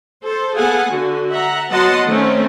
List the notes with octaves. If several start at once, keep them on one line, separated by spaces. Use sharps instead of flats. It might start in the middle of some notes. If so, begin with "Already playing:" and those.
A4 C5
B3 G#4 A4 F5 F#5 G#5
D3 F#4
E5 F#5 A#5
F#3 B3 D#5 F#5 A5 C6
D#3 A3 C4 C#4